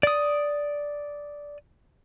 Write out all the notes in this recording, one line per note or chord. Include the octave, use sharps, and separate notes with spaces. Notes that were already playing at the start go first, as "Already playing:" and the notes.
D5 D#6